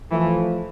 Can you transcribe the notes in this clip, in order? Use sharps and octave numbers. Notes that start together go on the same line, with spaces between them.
E3 F3 A3